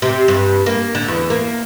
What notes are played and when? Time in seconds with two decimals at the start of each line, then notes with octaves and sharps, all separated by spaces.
0.02 C3
0.28 G2
0.66 A#3
0.95 D3
1.08 E2
1.30 A#3